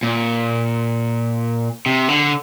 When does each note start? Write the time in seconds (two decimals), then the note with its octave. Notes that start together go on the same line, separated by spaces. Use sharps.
0.03 A#2
1.86 C3
2.09 D3